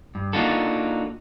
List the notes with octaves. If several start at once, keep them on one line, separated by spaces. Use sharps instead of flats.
G2
A#3 D4 D#4 F4 F#4 A4